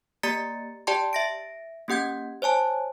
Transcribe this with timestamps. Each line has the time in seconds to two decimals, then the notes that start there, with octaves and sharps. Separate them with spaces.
0.23 A#3 G4 D5 A#5 A6 C#7
0.87 G4 D5 G5 A5 C6
1.13 E5 A#6 D7
1.88 A#3 C#4 G4 F#5 G6 G#6
2.42 C5 C#5 G#5 A5